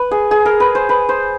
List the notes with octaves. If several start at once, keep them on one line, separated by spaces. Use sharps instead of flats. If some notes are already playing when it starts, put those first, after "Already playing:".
Already playing: B4
G#4
G#4
A#4
B4
C5
B4
C5